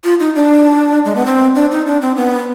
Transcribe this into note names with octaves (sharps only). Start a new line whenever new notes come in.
F4
D#4
D4
G#3
B3
C4
D4
D#4
D4
C4
B3